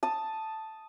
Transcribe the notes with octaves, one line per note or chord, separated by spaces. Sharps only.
A5 D#6